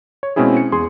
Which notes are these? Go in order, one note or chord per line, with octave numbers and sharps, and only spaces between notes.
C#5
B2 G#3 C4 C#4 E4 G#4
C#7
E2 G#4 C6